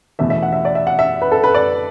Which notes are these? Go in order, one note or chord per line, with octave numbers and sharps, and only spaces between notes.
E2 B2 A3 E5
E5
F#5
E5
D5
E5
F#5
E5
B4
A4
B4
D5